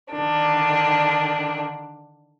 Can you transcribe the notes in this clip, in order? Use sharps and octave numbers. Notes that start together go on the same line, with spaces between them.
D3 D#3 D4